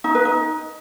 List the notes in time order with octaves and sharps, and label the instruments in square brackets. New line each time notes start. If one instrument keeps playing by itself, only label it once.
[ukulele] D#4
B4
D#4